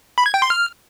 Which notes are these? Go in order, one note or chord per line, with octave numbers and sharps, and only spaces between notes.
B5
G#6
G5
C6
F6